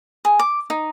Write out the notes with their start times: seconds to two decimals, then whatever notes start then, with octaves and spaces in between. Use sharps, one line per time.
0.25 G#4
0.39 D6
0.70 D#4